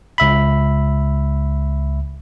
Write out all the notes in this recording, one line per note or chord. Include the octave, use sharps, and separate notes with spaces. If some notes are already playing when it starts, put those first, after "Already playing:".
C#2 E5 B5